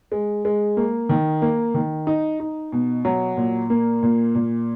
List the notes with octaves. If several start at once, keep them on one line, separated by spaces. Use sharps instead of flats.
G#3
G#3
A#3
D#3
A#3
D#3
D#4
D#4
B2
F#3
A#2
A#3
A#2
A#2